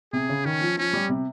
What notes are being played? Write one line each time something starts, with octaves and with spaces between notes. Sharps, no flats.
C3 G#4
C#3
D#3 C#4
F3
F3 C#4
G3
C3